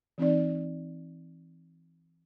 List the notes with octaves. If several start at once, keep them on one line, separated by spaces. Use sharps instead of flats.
E3 C4 D#4 D5